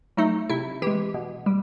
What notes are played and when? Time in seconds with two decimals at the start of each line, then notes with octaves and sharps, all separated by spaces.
0.17 F#3 A3 D#4
0.49 C3 E4
0.82 E3 G#3 G4
1.14 B2
1.46 G3